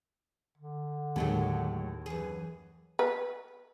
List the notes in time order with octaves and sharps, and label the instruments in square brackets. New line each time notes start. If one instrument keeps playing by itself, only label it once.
[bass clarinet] D3
[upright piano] D#2 [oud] A2 F#3 G#3
[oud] F#2 G#4 [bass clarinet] E3
[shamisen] B4